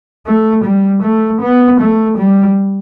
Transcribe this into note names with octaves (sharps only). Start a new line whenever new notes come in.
A3
G3
A3
B3
A3
G3